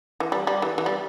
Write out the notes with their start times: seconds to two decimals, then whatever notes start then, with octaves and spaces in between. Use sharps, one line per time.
0.20 E3
0.32 G3
0.47 G3
0.62 E3
0.78 E3
0.86 G3